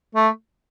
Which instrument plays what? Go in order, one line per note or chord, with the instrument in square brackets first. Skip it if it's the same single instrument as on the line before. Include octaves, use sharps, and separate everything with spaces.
[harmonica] A3